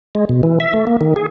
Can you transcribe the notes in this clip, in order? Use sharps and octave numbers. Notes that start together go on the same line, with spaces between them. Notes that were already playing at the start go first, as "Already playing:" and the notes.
G#3
B2
E3
E5
A3
A#3
D#3
G#4